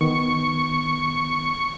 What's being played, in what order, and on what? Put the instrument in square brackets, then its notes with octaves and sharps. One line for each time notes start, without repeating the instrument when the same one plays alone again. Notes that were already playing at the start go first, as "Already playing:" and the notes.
[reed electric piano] D#3 B3 [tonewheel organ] C#6